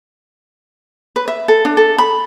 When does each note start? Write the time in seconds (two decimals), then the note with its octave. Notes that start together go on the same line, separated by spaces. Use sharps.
1.16 B4
1.28 E5
1.48 A4
1.65 D4
1.77 A4
1.98 B5